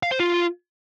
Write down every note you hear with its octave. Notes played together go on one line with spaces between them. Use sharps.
F5
C5
F4